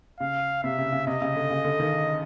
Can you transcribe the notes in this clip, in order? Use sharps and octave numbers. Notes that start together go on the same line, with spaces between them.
C#3 F5
C3 E5
C#3
C#3
C3 D#5
C#3
D3
C#3
D3
D#3